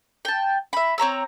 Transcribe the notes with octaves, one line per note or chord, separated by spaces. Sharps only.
G5 A5
E5 B5
C4 C#5 A#5 E6